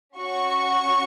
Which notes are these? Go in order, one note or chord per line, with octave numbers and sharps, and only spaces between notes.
C#4 F#4 C#6